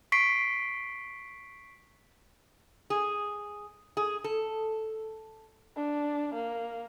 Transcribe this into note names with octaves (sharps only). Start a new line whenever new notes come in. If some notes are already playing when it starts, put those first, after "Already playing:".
C#6 B6 C7 D7
G#4
G#4
A4
D4
A#3